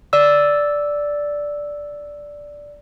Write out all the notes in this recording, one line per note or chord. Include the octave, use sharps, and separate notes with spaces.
D5 E6